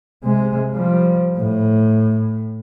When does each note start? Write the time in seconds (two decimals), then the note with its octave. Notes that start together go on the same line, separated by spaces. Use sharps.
0.24 C3 G#3
0.74 F3 G3
1.38 A2